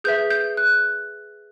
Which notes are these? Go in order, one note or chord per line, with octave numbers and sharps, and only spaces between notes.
G#4 B4 E5 G6
G6
F#6